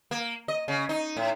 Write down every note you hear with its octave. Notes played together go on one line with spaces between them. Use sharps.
A#3
D#5
C#3
D#4
A2